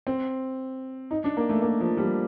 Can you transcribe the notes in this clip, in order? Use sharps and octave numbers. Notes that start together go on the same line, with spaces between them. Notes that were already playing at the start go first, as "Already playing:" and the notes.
C4
D#4
D4
A#3
A3
A#3
F3
G3